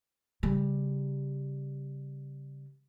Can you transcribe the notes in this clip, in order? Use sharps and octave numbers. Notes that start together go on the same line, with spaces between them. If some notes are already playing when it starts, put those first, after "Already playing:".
C#3 G3